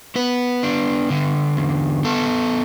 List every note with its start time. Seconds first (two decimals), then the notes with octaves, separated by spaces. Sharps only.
0.15 B3 B4
0.63 D4
1.10 D3
1.57 E2
2.05 B3 A4